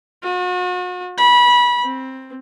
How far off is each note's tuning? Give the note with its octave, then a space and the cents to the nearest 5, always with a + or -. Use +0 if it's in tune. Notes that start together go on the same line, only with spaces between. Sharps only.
F#4 -40
B5 -25
C4 +10